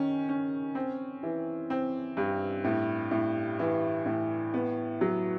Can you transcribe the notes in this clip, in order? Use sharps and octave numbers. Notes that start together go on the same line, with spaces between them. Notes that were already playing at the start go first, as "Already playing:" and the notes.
Already playing: D#3 C#4
C#4
C4
E3
C4
G2
A2
A2
E3
A2
B3
F#3